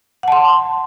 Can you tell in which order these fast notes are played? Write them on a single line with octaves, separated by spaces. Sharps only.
F#5 A5 C6